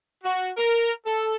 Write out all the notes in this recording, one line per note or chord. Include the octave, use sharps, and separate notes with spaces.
F#4
A#4
A4